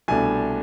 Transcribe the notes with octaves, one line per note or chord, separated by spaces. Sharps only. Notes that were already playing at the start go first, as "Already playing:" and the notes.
C2 B2 A3 D4 G#5